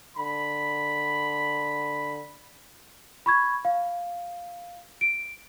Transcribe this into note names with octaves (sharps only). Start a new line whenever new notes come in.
D3 B5
B5 C#6 G#6
F5
D7